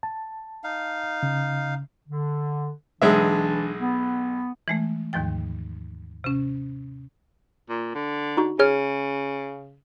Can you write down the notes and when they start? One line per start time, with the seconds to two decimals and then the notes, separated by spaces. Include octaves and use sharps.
0.03 A5
0.64 D#4 F5
1.23 C#3
2.09 D3
3.02 B1 E3 G#3 D4 E5
3.80 B3
4.68 E3 G#3 A3
5.13 D#2 G#2 D#3 F3 G5
6.24 C3 C#4
7.69 A#2
7.95 D3
8.37 D#4 F#4
8.59 C#3 G#4 C#5 F6